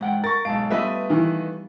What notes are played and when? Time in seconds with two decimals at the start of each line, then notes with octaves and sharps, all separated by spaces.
0.01 G#2 F#5 G5
0.24 A#4 C#6 A6
0.45 B1 G#2 F5 A5 D7
0.70 G3 A3 B3 F4 B4 D#5 E5
1.10 D#3 E3